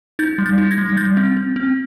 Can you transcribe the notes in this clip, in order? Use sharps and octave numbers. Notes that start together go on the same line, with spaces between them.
D#4 G6 A6
G3
G6 A6
D#4
G#6 A#6
G3
G3 G6 A6
C4
C4
C4